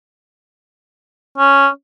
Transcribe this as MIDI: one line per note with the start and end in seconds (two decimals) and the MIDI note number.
1.38 1.68 61